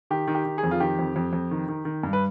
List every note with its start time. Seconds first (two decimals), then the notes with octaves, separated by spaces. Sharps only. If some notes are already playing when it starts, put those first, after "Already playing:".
0.11 D#3 G4
0.28 D#3
0.35 G4
0.45 D#3
0.58 G#4
0.63 F2
0.71 F4
0.80 D#3 G4
0.99 F2
1.16 F2
1.33 F2
1.51 D#3
1.68 D#3
1.85 D#3
2.03 G2
2.13 B4